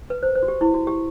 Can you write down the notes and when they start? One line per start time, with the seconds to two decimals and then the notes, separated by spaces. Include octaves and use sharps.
0.10 B4
0.23 C5
0.35 C5
0.43 F#4
0.48 G4
0.61 E4
0.74 F#4
0.87 G4